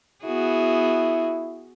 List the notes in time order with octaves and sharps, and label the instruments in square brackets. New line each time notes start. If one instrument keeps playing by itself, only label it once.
[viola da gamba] B3 F#4 G#4 [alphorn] E4